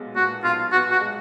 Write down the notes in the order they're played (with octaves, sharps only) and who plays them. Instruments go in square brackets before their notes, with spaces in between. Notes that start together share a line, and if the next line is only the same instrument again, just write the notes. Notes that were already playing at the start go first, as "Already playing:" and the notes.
Already playing: [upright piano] B1 A#2 G#3 B3
[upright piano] A#2 [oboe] F#4
[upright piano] B1 [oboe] F4
[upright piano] B3 [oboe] F#4
[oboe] F#4
[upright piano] G#3